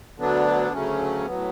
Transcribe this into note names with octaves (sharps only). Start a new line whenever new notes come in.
D2 D3 F#3 B3 D4
D2 C#3 F#3 A3 C#4
A2 F#3 B3